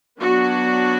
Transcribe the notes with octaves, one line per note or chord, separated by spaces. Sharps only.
F#3 B3 D4 F#4